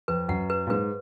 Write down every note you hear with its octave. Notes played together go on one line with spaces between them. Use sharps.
F2 B4
F#2 F#5
B4
A#2
G#2 B4